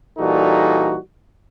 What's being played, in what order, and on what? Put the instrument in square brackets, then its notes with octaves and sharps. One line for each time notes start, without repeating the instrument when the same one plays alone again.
[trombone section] A#2 E3 G3 D#4 F#4 A4